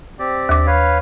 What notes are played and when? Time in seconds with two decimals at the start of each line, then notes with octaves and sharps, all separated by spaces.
0.19 C4 G4 D5
0.49 D#2 D6
0.66 B4 C#5 F5